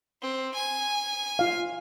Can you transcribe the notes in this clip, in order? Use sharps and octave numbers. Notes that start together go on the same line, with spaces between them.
C4
G#5
F4 F5